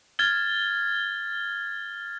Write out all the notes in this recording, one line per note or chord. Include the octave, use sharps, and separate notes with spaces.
F6 G#6 A6 G7